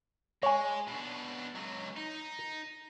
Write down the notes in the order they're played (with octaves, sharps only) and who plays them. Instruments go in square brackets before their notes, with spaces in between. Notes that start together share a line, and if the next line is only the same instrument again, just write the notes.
[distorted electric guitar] G#3 [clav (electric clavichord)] C#5 G#5
[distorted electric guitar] B2 D4
C#2 F#3
D#4